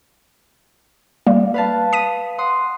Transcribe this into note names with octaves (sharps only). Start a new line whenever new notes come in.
G3 A#3
B4 F5 A5
D#6 B6 D#7
F#5 C6 D#6